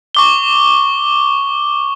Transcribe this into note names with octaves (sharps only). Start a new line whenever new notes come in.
C#6 D6 G7